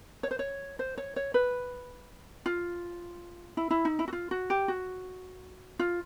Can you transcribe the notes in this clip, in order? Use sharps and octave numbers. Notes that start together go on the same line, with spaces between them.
C#5
C5
C#5
C5
C#5
C#5
B4
F4
E4
E4
D#4
E4
F#4
F4
F#4
G4
F#4
F4